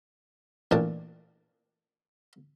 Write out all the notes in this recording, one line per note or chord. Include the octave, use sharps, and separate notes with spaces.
A1 A#2 D4 A5